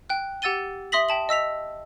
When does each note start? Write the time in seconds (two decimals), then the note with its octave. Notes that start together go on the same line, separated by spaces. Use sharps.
0.10 G5 F#6
0.42 G4 F#5 E6 A6 D#7 G7
0.92 E5 C6 D#6 A#6 B6 F#7
1.09 G5 A5 F#7
1.29 D#5 E6 B6 F7